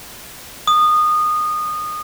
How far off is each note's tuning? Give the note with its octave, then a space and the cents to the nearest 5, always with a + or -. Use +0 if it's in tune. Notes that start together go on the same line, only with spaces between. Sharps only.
D#6 -20